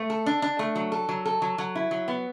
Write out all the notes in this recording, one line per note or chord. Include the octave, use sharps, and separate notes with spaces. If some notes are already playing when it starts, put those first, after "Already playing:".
Already playing: A3
A4
D4
D4
A3
F#3
A4
F#3
A4
F#3
F#3
E4
F#3
B3